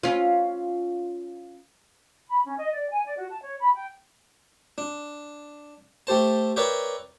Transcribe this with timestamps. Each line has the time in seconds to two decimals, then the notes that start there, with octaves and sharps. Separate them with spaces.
0.03 C#4 F4
2.29 B5
2.46 C#4
2.59 D#5
2.72 D5
2.90 G#5
3.05 D5
3.17 F#4
3.29 A5
3.43 C#5
3.60 B5
3.73 G5
4.78 D4
6.07 A3 G4 C5 A5
6.56 A#4 B4 C#5 D5 E5 G5